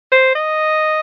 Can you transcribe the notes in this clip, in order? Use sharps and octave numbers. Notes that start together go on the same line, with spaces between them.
C5
D#5